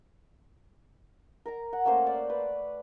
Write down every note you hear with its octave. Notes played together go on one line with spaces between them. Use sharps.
A#4 A#5
F#5
A3 A#3 C#4 C5
D5
B4